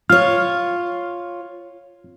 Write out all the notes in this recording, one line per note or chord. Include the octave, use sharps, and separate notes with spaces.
F4 C#5 F6